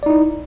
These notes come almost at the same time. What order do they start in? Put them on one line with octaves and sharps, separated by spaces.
D5 D#4 E4